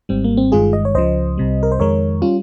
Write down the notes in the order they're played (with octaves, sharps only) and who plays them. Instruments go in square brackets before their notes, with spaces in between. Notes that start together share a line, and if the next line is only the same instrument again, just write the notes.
[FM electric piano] G#1 G#2 G3 C4
A#3
C4
G1 G2 D#3 G#3 F4 G#4
D#5
C#5
C#2 C#3 F3 C5 D#5
C2 C3 G3
A#4
C5
F2 D#3 G#3 A#4 C#5
G3 C#4 F4